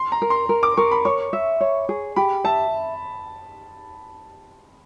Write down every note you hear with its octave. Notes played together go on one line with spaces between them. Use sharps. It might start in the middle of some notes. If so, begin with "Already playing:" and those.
Already playing: C6
A#5
A#4
C6
A#4
D6
A#4 C#6
B5
C#5 C#6
E5
C#5
G#4
G4 B5
E5 A5